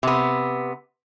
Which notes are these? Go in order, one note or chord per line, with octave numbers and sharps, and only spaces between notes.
C3 B3